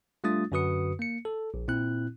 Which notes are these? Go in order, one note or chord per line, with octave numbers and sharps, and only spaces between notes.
G3 A3 D4 F4 D#6 A6
F#2 D3 F#4 B4 D#6 C#7
A#3 C#7
A4
A#1
A#2 C4 E4 F#6